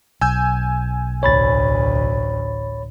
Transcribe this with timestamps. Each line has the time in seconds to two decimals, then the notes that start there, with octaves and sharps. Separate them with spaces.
0.21 B1 G#5 E6 G6
1.23 A1 D2 C#5 B5 A6